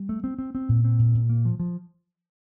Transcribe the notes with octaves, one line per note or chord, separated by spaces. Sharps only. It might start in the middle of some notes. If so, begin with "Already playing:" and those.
Already playing: G3
A3
C4
C4
C4
A#2
C4
A#2
A#2
A#3
F3
F3